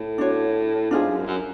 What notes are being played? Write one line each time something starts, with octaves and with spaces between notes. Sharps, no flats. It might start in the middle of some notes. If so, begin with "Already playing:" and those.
Already playing: A2
D4 F#4 C#5
G#2 D4 F4 G#4
F#2
F#2